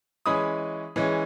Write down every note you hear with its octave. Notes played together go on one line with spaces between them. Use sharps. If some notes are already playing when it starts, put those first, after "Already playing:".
E3 G#3 C#4 B5 D#6
E3 G#3 C#4